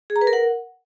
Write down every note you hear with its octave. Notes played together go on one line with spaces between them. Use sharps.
G#4
A#5
B4
A#4
F#5